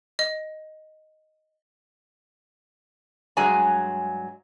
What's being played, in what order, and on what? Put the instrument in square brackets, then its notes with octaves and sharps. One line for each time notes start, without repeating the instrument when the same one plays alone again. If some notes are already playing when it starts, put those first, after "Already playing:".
[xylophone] D#5
[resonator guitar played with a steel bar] G2 F#3 G#3 G#4 G#5 A#5